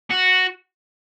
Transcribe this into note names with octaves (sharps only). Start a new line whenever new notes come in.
F#4